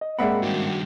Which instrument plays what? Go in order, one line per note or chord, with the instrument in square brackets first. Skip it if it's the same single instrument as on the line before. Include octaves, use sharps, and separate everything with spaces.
[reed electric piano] D#5
[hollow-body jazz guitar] G#2 A#3 C4 [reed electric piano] G#4 B5 [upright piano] D5 E5 F#5
[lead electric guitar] G2 D#3 [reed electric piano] F#4